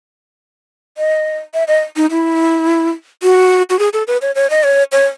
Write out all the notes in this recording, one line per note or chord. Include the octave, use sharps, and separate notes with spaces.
D#5
E5
D#5
D#4
E4
F#4
F#4
G#4
A4
B4
C#5
C#5
D#5
C#5
C#5